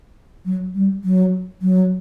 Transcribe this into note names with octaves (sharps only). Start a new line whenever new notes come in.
F#3
G3
F#3
F#3